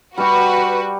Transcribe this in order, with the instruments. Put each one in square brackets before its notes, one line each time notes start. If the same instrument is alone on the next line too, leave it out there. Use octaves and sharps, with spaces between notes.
[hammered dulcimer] G3 G4 [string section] F#4 B4